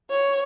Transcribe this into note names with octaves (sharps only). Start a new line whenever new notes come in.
C#5